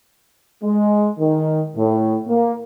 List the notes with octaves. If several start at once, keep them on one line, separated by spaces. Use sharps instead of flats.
G#3
D#3
A2
A#3